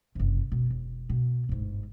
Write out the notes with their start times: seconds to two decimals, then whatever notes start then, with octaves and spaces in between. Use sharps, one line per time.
0.15 F#1 C3
0.52 B2
0.70 E1
1.09 B2
1.49 G1 G#2